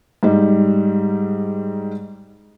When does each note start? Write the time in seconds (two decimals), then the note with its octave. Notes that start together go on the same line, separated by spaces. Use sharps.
0.23 G#2 G3 D#4